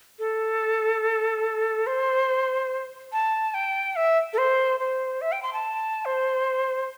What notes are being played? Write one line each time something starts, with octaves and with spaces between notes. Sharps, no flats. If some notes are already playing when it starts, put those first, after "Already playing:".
A4
C5
A5
G5
E5
A4
C5
C5
E5
G5
C6
A5
C5